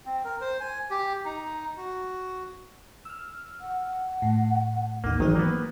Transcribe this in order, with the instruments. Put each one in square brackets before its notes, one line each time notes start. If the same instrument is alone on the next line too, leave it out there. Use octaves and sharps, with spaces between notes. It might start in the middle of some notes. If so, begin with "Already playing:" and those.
[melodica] C4
A#4
C5
G#5
G4
D#4
F#4
[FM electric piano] E6 F6
[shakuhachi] F#5
[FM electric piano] A2
[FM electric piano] A1 D#2 D#4 [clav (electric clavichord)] A#3
[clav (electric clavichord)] G#1 D#3 [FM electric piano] E3 F#3 D#4
[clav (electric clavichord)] A#3 B3